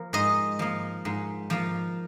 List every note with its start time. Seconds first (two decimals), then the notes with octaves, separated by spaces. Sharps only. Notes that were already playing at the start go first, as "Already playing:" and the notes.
Already playing: F3 A#3
0.13 G#2 D#5
0.59 F3 A#3
1.05 G#2
1.50 F3 A#3